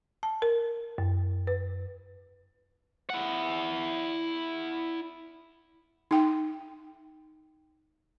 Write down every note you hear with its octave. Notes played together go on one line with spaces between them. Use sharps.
A5
A#4
F#2
B4
E4 F#5
D#4 G5